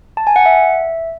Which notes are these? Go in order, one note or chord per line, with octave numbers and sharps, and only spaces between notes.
A5
G#5
F#5
E5